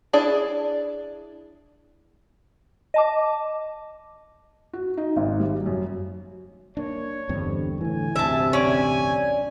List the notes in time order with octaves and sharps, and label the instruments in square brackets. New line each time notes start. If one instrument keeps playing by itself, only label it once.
[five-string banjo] D4 E4 G#4 D5
[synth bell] D#5 A5 D6
[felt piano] F#4
D#4
G#1
G3
F#2
[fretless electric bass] A#3 D4 [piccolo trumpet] C#5
[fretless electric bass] E2 G2 C4 [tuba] D3
[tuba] A2 [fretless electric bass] D3 E3 [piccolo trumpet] G#5
[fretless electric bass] A1 D2 G2 [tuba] C3 [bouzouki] E5 A5
[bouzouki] C#4 D5 [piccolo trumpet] G#5